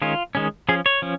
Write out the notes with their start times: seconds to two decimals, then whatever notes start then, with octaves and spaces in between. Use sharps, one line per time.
0.02 D#3 G#3 C#4 F4
0.35 D#3 G#3 C#4
0.69 F3 C#4 G#4
0.86 C#5
1.02 F3 C#4